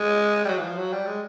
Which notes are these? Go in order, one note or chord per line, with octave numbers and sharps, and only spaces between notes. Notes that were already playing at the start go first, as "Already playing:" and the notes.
Already playing: G#3
G3
F#3
E3
F3
F#3
G3
G#3